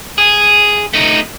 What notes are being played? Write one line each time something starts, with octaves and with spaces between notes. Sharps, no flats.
G#4
A3 D#4